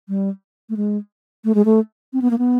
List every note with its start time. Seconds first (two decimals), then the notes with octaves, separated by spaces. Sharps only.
0.09 G3
0.70 A3
0.77 G#3
1.45 A3
1.55 G#3
1.65 A3
2.13 C4
2.22 B3
2.31 A#3
2.38 B3